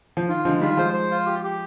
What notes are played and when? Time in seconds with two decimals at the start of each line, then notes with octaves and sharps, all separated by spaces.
0.17 F3
0.28 D#3 F4
0.45 D3 F3 G#3
0.61 D#3 G3 F4
0.77 F3 G#3 C5
0.93 C5
1.11 F4
1.26 G4
1.44 G4